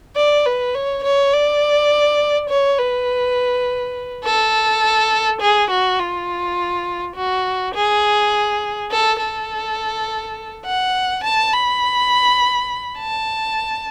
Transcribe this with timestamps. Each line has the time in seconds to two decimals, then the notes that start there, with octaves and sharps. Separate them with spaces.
0.17 D5
0.46 B4
0.75 C#5
1.04 C#5
1.33 D5
2.49 C#5
2.79 B4
4.24 A4
5.41 G#4
5.70 F#4
5.99 F4
7.16 F#4
7.74 G#4
8.91 A4
9.20 A4
10.66 F#5
11.24 A5
11.53 B5
12.99 A5